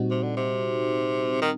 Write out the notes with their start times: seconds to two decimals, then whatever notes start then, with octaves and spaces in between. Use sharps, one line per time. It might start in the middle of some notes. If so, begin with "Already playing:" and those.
Already playing: A#2 G3 C4 D#4 F#4
0.11 C3
0.23 D3
0.37 C3
1.42 D#3